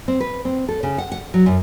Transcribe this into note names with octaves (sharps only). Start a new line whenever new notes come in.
C4
B4
C4
A4
C#3
F#5
F#5
F#3
F#2